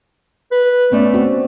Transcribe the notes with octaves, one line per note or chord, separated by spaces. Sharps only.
B4
A3 B3 C#4 D5
C4 F#4